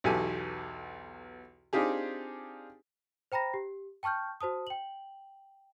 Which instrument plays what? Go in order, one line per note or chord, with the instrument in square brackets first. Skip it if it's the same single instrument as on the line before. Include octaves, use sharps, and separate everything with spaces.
[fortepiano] B1 E2 B2 G4 A4 G#5
C4 D4 D#4 F4 G4 G#4
[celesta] C5 G5 A#5 B5 A#6
G4
G5 A5 C#6 F6 G6
F#4 C5 A5 D#6
G5 F#7